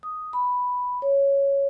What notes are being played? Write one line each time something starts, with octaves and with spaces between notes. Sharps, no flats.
D#6
B5
C#5